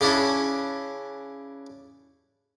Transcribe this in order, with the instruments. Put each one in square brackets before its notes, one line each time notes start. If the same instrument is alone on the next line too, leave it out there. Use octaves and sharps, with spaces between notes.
[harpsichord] C#3 C#4 D4 E4